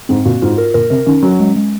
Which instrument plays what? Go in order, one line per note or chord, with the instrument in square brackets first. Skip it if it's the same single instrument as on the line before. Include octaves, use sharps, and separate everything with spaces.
[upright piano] G#2 [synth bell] C4
[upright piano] A#2 [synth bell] F#4
[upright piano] G#2 [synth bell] F4
[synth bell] A#4
[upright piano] A#2 [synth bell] A#4
[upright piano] C3 [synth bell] A#4
[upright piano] D#3 [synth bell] C#4
[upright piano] F#3 [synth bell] C#4
[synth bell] G#3
G#3